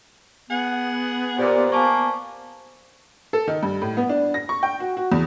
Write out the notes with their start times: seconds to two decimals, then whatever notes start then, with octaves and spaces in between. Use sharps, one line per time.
0.49 B3 G#4 F#5
1.38 A#2 G4 C5 D5
1.72 A#3 F4 G4 G#5 A5 C#6
3.33 A4
3.48 D#3
3.63 G2
3.82 A2
3.97 B3
4.09 D4
4.34 A#6
4.49 C#6
4.63 G5
4.80 F#4
4.97 F#4
5.12 E2